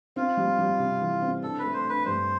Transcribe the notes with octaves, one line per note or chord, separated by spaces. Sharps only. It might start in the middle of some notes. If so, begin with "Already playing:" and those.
C4 F4
G3
G3
C3
E3
C4
D4 A4
A3 B4
C5
D4
B4
G2 C5